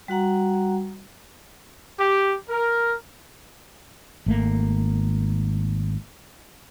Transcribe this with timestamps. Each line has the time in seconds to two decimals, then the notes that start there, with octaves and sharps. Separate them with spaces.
0.08 G3 F#4 F#5 A#5
1.99 G4
2.49 A#4
4.26 G#1 A3 A#3